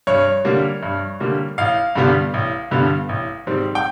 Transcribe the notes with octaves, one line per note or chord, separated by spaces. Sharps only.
G2 C#5
D3 G3 A#3
G2
D3 G3 A#3
A1 F5
G2 D3 G3 B3
A1
G2 D3 G3 B3
A1
G#2 D#3 G3 C4
G5